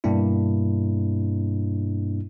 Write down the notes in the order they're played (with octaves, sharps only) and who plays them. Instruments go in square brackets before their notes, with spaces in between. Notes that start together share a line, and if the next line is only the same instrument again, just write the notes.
[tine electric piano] G2 B2 A#3 D4 E4